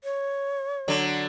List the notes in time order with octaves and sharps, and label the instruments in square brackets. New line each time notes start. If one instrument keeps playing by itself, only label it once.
[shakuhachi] C#5
[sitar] D3 F#3